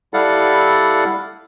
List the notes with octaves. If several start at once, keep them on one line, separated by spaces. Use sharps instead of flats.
G3 E4 A4 D5 F5 F#5